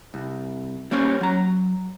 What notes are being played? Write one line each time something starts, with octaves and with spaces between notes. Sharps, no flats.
C2
G3 A#3 C#4 C5 C#5
F#3 A#5